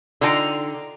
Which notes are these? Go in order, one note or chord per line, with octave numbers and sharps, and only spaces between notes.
D3 D#4 F4 G5 G#5 A#5